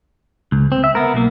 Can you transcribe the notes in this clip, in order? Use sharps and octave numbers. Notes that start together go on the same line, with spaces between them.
C#2
C4
E5
B3 A#4
B1 A#3